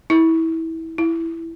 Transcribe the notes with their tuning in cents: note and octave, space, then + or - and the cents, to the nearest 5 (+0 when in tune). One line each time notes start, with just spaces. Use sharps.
E4 -20
E4 +5